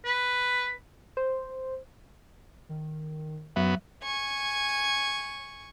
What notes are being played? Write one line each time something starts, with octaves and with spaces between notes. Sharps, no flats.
B4
C5
D#3
F#2 F#3 B3
G#5 C#6